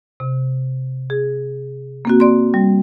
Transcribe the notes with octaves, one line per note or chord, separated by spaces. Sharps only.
C3
G#4
A#3 C4 F#4
D5 C6
G3